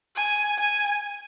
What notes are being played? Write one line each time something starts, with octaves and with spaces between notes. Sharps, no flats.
G#5
G#5